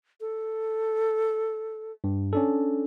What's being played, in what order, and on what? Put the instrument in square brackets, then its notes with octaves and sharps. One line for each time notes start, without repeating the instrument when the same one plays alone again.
[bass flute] A4
[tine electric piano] G2
C#4 D4 A4